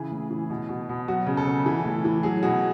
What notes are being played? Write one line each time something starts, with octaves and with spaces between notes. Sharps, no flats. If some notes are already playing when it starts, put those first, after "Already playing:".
Already playing: C#3 E3 G#4
A2
E3
B2
B2
B2
F#3 F#4
C#3
A4
C#3
E3
A2
E3
F#3 G#4
B2 F#4